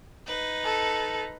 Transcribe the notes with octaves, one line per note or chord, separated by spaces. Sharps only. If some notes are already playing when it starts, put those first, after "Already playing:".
D#4 B4
A4